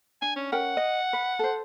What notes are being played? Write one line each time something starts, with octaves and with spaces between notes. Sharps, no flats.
D4 G#5
C#4
C#4 A#4 F#5 G5
D#5
B4
A4 C5